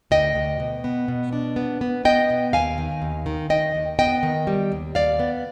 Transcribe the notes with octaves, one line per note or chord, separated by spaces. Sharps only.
D2 D#5 G5
D2
B2
B3
B2
D4
B3
B3
B3 D#5 G5
B2
D#2 F5 G#5
D#3
D#2
D#3
D#3 D#5 G5
D#2
B3 D#5 G5
D#3
G3
D#2
D#2 D5 F5
B3